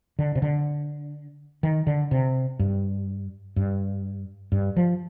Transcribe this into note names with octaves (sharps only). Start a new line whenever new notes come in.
D3
C3
D3
D#3
D3
C3
G2
G2
G2
F3